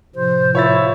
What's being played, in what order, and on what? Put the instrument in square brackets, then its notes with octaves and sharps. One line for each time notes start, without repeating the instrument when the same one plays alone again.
[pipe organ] A2 C3 F3 [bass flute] C5
[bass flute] E4 [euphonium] F4 [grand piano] C#5 E5 A6